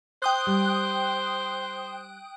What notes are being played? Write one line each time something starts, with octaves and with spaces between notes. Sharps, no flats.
C5 G5 D#6 F#6
G3